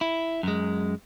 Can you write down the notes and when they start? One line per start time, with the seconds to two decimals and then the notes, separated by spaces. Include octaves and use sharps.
0.01 E4
0.43 F#2 G#3